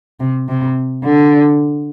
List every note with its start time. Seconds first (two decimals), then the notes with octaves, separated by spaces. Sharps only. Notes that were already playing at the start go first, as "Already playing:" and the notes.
0.20 C3
0.48 C3
1.05 D3